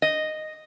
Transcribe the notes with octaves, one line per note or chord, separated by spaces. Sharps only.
D#5